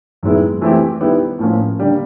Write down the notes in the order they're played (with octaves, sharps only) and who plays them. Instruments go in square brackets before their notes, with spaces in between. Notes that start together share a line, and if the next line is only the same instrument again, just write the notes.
[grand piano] F#2 D#3 G#3 B3 E4
E3 A3 C4 E4 G4
D#3 G3 B3 E4 G4
A2 F3 A#3 C#4 F4
D3 G3 A#3